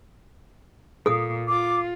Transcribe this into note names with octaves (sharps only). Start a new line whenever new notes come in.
A#2 A4 D#6
F4 D6